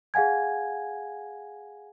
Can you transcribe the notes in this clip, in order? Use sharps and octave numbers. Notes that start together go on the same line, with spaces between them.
G#4 F5 F#5 G#5 G#6